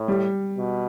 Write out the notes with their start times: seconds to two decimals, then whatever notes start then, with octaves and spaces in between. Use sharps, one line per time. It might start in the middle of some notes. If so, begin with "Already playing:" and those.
Already playing: A2
0.08 G3
0.58 B2